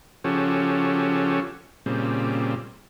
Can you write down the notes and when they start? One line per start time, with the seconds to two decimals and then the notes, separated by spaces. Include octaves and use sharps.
0.24 C#3 F3 C#4 F#4 G4 A4
1.86 A#2 C#3 G3 C4